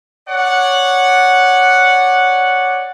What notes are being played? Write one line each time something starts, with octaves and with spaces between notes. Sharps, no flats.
C#5 D5 F#5